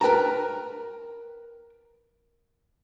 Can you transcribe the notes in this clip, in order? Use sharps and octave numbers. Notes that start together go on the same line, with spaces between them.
A#4 B4 G5 A5 A#5